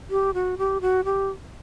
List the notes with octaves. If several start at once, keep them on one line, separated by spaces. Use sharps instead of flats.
G4
F#4
G4
F#4
G4